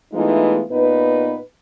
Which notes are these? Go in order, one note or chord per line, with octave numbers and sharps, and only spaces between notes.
E3 G#3 A3 B3 D#4 F4
A#2 B3 D#4 B4